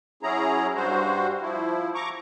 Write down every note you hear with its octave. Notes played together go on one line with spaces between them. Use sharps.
F#3 C#4 E4 G#4 A#5
G2 G3 F#4 C5
F3 E4
A#5 C#6 D6